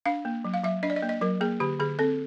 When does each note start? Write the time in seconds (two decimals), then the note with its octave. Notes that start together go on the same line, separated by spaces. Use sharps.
0.06 D4 F5
0.25 A#3
0.45 F#3
0.54 F5
0.63 F#3 E5
0.83 D4 D#5
0.90 D5
0.96 D#5
1.02 A#3
1.09 D#5
1.21 F#3 A#4
1.41 A#3 G#4
1.60 D3 G4
1.80 D3 G#4
1.99 C4 A4